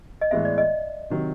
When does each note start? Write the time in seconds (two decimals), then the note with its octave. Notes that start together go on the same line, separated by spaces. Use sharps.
0.21 D#5
0.31 A2 E3 G#3 B3 E5
0.45 D5
0.58 D#5
1.10 C3 D#3 F#3